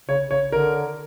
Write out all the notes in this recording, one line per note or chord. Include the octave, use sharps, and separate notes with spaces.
C#3 C#5
C#3 C#5
D3 A#4